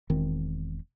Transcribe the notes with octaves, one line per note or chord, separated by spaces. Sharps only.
E1 D#3 C4